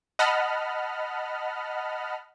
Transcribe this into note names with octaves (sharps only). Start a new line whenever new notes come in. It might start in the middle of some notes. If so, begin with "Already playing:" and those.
D#5 F#5 A5 B5 F6